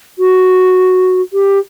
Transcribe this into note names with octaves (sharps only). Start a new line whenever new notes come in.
F#4
G4